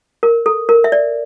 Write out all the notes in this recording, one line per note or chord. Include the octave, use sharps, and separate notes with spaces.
A#4
A4
A#4
E5
D5